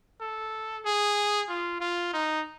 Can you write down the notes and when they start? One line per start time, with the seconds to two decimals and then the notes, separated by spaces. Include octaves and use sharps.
0.21 A4
0.85 G#4
1.49 F4
1.81 F4
2.13 D#4